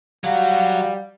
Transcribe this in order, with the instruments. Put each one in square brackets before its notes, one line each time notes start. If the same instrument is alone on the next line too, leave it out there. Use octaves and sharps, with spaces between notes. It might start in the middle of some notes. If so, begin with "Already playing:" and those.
[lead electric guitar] F#3 F#4 [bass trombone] G3 [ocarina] F5